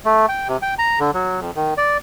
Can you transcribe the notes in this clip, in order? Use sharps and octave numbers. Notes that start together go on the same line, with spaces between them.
A3
G5
C3
G5
A#5
D3
F#3
F2
D#3
D5